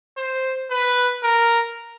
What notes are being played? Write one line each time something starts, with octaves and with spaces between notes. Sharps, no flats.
C5
B4
A#4